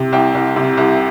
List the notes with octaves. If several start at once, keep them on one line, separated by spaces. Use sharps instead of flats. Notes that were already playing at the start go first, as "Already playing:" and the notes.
Already playing: C3
C2 G5
C2
C3
C2